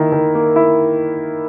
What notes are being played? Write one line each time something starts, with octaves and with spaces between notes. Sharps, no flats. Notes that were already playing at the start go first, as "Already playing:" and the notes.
Already playing: D#3 A#3 E4
D#3
A#3
E4